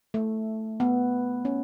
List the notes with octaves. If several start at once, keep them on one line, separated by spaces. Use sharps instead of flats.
A3
B3
C#4